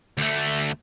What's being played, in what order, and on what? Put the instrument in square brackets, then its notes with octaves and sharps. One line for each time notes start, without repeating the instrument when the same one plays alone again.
[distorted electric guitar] D2 A3